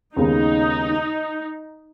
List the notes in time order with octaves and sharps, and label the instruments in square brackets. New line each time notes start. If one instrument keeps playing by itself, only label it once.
[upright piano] D#2 C#3 G#3 B3 [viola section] D#4